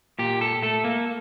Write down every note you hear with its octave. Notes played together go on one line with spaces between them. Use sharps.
A#2 G4
A4
A3 A4
A#3